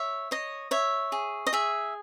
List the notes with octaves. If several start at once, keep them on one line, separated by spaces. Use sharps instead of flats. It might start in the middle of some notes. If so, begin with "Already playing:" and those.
Already playing: C#5 E5
C#5 D#5
C#5 E5
G#4
D#5
G#4 E5